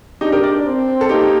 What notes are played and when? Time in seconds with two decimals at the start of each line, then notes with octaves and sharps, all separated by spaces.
0.21 D4 D#4 G4
0.32 G4 A#4
0.43 A#4 D5
0.65 C4
1.01 A4
1.09 A#3 D#4 G4